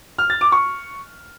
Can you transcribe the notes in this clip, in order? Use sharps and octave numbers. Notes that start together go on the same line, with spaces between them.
F6
A6
D6
C#6